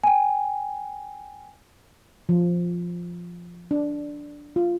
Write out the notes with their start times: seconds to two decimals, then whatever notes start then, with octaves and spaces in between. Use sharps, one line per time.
0.04 G5 G#5
2.29 F3
3.71 D4
4.56 F4